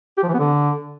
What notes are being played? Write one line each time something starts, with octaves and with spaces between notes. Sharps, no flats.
G4
F3
E3
B3
D3